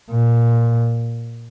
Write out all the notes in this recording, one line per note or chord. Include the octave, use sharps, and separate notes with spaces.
A#2